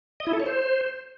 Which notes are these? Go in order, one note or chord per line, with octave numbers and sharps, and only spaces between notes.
D#5
E4
A4
C#5
C5